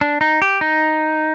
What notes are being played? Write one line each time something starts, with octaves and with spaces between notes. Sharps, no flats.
D4
D#4
G4
D#4